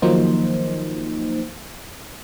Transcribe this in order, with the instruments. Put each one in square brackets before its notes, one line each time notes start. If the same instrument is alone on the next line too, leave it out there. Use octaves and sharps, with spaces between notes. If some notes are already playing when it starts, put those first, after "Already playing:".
[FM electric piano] D#3 F3 F#3 A#3 D#4 C5